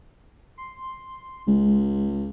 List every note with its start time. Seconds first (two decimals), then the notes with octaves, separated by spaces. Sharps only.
0.58 C6
1.47 C#2 G#3